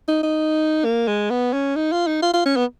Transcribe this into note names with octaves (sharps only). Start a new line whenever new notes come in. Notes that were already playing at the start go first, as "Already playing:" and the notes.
D#4
D#4
A#3
G#3
B3
C#4
D#4
F4
D#4
F4
F4
C#4
B3